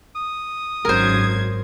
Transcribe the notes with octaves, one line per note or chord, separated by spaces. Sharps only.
D#6
G#1 F#2 A#4 C5 G#6